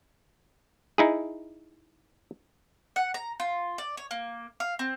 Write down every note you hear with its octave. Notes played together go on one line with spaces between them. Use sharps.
D#4 E4 G#4
F#5
A#5
F4
D5
C#5
A#3
F5
C4